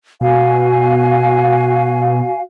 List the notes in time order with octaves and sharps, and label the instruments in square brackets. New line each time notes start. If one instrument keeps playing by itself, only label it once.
[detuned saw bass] B2 [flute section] F#4 F5 G#5